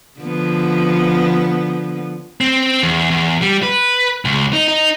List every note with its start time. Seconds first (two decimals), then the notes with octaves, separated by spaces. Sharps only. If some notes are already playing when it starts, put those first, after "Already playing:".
0.20 D3 F3 B3
2.41 C4
2.83 E2
3.10 E2
3.42 G3
3.63 B4
4.25 C#2
4.53 D#4
4.68 D#4